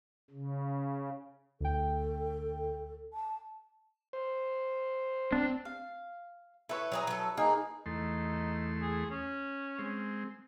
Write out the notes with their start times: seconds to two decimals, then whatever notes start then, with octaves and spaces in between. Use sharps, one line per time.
0.31 C#3
1.61 D2 A4 G5
3.13 A5
4.13 C5
5.33 C4 D4
5.65 F5
6.69 E4 A4 B4 C#5
6.92 F#3 G#4 A#5
7.07 F#3 A4
7.37 A#3 D#4 G#4
7.86 E2 A3 D#4 C6
8.81 G#4
9.11 C#4
9.79 G#3 C4